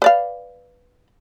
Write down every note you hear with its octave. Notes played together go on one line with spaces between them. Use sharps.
B4 D5 F5